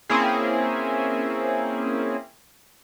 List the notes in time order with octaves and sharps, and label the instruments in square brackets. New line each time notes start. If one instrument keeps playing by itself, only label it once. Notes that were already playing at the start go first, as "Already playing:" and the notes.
[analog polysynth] A#3 C4 C#4 E4 G#4